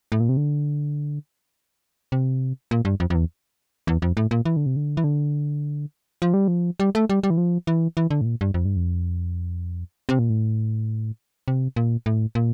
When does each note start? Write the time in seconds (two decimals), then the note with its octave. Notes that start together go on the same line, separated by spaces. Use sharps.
0.12 A2
0.20 A#2
0.29 C3
0.37 D3
2.12 C3
2.71 A#2
2.85 G2
3.00 F2
3.10 F2
3.15 E2
3.87 E2
4.02 F2
4.17 A2
4.31 A#2
4.45 E3
4.57 D3
4.66 C3
4.76 D3
4.97 E3
5.04 D3
6.22 F3
6.34 G3
6.48 F3
6.80 G3
6.95 A3
7.09 G3
7.23 G3
7.30 E3
7.37 F3
7.67 E3
7.97 E3
8.11 D3
8.21 A2
8.25 A#2
8.41 G2
8.54 F2
8.65 G2
8.76 F2
10.09 C3
10.19 A#2
10.30 A2
11.48 C3
11.76 A#2
12.06 A2
12.35 A#2